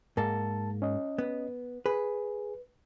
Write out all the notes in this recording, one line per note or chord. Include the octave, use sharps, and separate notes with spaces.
G#2 A#3 A#4 A5 A6
C#4 D#5
B3
G#4 B4